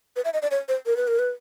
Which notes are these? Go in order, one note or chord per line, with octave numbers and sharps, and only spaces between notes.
B4
E5
D#5
D5
C#5
C5
A#4
B4
A#4
B4